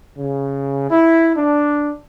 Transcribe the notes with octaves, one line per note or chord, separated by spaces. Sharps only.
C#3
E4
D4